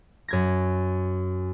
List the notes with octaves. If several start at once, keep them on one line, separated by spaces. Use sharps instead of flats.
F#2 G#6 A#6